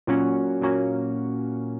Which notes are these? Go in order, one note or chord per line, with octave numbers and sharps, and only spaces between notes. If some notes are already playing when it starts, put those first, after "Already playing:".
A#2 F#3 A#3 C#4 F#4
A#2 F#3 A#3 C#4 F#4